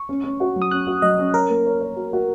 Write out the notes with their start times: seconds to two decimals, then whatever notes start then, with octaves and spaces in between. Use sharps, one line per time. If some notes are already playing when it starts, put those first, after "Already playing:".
Already playing: C#6
0.09 C#4
0.24 C#4
0.40 F#4
0.56 F#3
0.62 D#6
0.71 C#4 F#6
0.87 F#4
1.02 F#3 D#5
1.19 C#4
1.34 A#4 C#5
1.49 A#3
1.66 C#5
1.81 C#5
1.96 F#4
2.13 F#4